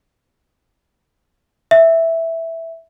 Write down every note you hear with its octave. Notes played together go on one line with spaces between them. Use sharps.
E5